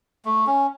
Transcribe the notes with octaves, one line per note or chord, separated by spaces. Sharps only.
A3
C#4